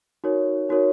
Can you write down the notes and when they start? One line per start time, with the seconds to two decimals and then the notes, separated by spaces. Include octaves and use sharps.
0.24 D#4 F#4 A#4 C#5
0.69 D#4 F#4 A#4 C#5